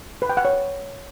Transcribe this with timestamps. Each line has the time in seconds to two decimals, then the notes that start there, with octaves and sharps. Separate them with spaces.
0.22 B4
0.30 G5
0.37 F#5
0.45 C#5